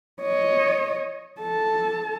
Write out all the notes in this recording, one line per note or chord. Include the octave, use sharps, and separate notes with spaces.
C#5 D#5
A4 A5